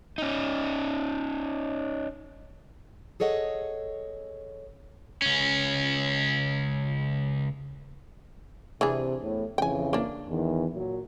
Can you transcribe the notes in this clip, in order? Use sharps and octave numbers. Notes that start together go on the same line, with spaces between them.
C#4 D#4
G#4 A4 C#5 D#5 F#5
C#2 C#4
C3 E3 D4 G#4
E2 A2
F2 C#3 E3 G5 G#5
A#3 D4
E2 D#3 E3
A#2 F#3